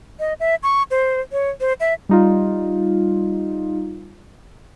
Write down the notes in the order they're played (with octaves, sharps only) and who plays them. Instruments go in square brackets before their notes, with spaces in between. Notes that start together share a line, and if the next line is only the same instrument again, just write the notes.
[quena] D#5
E5
C#6
C5
C#5
C5
E5
[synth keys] G3 D#4 F4